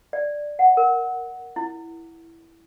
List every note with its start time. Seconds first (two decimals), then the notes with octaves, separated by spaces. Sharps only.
0.13 D5
0.59 F#5
0.77 A#4
1.56 E4